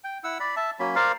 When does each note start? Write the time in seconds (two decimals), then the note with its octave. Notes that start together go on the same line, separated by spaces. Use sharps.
0.04 G5
0.24 E4 F#5 E6
0.40 D5 B5
0.57 E5 A5
0.80 F#3 A#3 C#4 B5
0.95 A#4 C5 D5 F5